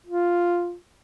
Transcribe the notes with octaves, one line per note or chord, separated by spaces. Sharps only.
F4